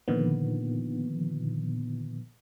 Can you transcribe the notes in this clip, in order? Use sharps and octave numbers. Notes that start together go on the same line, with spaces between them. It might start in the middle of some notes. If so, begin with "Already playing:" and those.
A#2 D3 D#3 F3 B3